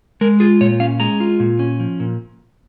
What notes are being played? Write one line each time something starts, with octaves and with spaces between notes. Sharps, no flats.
G#3 A#4
F4 G#4
A#2 C#5
C#4 F5
G#3 A#5
F4
A#2
C#4
F3
A#2